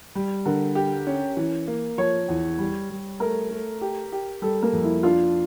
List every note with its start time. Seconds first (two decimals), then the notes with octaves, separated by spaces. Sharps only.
0.15 G3
0.45 D3 A#4
0.75 G4
1.07 C#4
1.37 E3
1.68 A#3
1.98 F3 C#5
2.28 E2
2.58 G3
2.90 G3
3.20 A3 A#4
3.51 A3
3.81 G4
4.12 G4
4.42 G3 A4
4.63 A#3
4.73 F2
4.83 E4
5.03 D4 F4